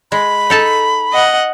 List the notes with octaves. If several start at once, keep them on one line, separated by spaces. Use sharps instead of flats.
G#3 B5
D#4 A4 A5
D#5 F#5